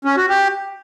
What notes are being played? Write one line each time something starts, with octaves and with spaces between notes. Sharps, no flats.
C#4
F#4
G4